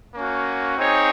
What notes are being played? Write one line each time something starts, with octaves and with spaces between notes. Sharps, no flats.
A#3 C#4 F#4
C4 D#4 G#4 C#5